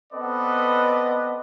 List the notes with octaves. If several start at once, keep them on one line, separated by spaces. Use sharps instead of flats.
B3 C4 A4 B4 D5 D#5